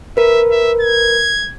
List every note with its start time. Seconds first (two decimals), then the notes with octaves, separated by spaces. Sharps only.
0.17 A#4 B4 E5
0.51 E5
0.82 G#6